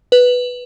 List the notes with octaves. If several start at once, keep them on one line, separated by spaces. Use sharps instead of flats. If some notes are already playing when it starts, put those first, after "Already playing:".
B4